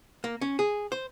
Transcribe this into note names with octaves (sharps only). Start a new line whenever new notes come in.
A#3
C#4
G#4
C5